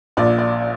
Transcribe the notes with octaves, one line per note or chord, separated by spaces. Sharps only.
A#1 A#2 D5
D5